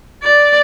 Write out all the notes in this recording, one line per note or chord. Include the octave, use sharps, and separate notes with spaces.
D5